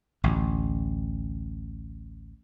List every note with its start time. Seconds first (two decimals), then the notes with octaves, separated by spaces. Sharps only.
0.24 A1 D2